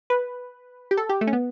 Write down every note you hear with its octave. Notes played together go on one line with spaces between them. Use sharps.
B4
G4
A4
G4
A3
C#4
B3